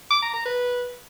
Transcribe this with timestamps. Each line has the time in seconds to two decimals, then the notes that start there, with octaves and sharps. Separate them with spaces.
0.11 D6
0.22 A#5
0.34 A#5
0.45 B4